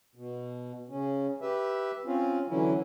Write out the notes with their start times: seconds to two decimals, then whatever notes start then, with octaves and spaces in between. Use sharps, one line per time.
0.15 B2
0.90 C#3 C#4
1.42 G4 B4 E5
2.06 C4 C#4 F4
2.49 D3 E3 F#3 C#4 E4